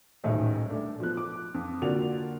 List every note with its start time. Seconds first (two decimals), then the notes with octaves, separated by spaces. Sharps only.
0.24 D#1 B1 A2 C#4 D#4 G#4
0.70 A3 D4
1.00 F3 B3 F#6
1.17 D6
1.54 F2
1.82 D3 A#3 F4 F#4 D5 F7